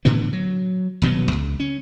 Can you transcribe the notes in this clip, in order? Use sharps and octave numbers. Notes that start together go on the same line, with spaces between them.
A2 D3 E3 B3
F#3
D#1 B2 F#3 B3
C#2
C#4